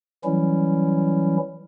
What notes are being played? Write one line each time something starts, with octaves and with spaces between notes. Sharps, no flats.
E3 F#3 G3 C#4 E4